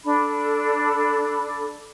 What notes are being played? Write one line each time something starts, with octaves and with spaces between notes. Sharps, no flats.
D4 A4 B5